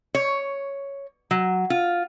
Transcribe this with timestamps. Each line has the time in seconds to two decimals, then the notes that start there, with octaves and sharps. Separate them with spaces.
0.15 C#5
1.31 F#3
1.70 F4